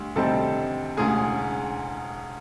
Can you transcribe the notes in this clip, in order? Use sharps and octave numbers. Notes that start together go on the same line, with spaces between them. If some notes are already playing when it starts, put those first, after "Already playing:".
Already playing: D2 G3
D2 C3 D#3 G3 C4 A4 A5
E1 D2 C#3 G#4 G#5